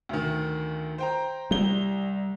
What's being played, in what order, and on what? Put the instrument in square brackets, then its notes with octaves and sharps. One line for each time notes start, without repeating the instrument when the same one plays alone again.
[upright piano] D2 D#3
C5 G5 A#5
[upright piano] C2 G7 [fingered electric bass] G3